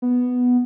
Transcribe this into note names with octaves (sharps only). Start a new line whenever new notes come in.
B3